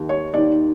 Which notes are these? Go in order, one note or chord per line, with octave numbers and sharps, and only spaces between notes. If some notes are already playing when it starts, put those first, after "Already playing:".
Already playing: D#2 D#3
C#5
D#2 D#3 D5